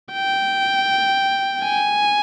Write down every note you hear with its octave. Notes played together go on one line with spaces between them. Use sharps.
G5
G#5